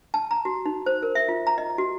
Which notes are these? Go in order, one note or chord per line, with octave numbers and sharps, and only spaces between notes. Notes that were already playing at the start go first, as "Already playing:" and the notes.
A5
A#5
F#4
D#4
C5
A#4
E5
F4
A#5
D#5
F#4